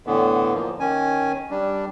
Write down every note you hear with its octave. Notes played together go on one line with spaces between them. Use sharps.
A2 D3 E3 B3
F3 A#3
D#3 C#4 G#5
G3 D4